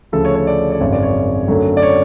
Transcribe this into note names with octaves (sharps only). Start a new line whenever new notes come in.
D2 C#3 F3 A3 A4
C#5
C#5
D5
D5
G#1 F#2 C#3 C#5
D5
C#5
F#2 D3 F#3 A3
D5
C#5